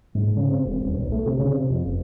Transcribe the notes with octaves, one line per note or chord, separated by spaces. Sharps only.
G#2
C#3
C4
E1
D#1
B1
A3
C3
C#3
C3
F2
F#1